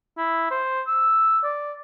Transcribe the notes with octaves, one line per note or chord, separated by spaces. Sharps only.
E4
C5
E6
D5